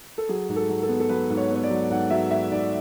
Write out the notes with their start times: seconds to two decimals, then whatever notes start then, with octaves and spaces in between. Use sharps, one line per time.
0.18 A4
0.29 F#3 G#4
0.49 G#2
0.56 A4
0.69 F#3
0.83 A4
0.89 B3
1.00 A4
1.09 F#3 B4
1.30 G#2
1.37 C#5
1.51 B3 C#5
1.63 D5
1.71 F#3
1.90 G#2 F#5
2.10 F#3 E5
2.31 G#2 E5
2.51 G#2 D5